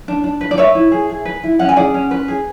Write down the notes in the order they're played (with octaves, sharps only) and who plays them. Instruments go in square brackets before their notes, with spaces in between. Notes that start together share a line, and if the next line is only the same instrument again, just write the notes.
[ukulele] D4
D4
B4
D5
B4 C#5 E5
E4
G#4
G#4
B4
E4
C#4 F#5
G#5
G#4 D5 F#5
C#4
B4
G#4